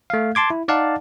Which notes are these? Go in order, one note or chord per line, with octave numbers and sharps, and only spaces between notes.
A3 F5
A5 C6 D6 G#6
E4
D#4 D5 F5 F#5 A5